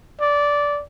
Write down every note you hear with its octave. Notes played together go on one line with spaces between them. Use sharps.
D5